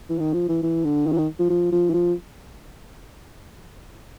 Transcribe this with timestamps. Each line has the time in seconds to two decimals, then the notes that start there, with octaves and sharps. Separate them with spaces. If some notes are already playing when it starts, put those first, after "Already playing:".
0.10 E3
0.19 D#3
0.33 F3
0.49 E3
0.63 E3
0.84 D3
1.07 D#3
1.12 E3
1.18 D#3
1.39 F3
1.50 F3
1.72 F3
1.90 E3
1.94 F3